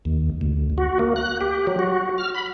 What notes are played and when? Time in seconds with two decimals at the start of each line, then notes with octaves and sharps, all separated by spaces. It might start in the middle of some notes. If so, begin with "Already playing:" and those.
0.05 D#2
0.41 D2
0.78 F#4
0.99 A#3
1.16 F#6
1.41 G4
1.67 F#3
1.79 F#4
2.18 F6
2.35 B5